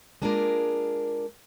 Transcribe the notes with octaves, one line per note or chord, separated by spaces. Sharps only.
G#3 A#3 D4 F4 G#4 A#4